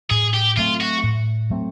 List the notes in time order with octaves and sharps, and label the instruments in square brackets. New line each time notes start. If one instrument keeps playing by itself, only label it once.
[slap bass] A2 [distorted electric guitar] G#4
[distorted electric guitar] G4
[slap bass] F#3 A3 C4 [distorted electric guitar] F4
[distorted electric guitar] F#4
[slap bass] A2
F#3 A3 C4